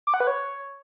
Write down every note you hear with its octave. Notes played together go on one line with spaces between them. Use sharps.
D6
F#5
B4
C#5